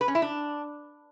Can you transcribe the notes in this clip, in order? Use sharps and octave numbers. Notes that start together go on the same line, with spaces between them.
B4
C#4
E4
D4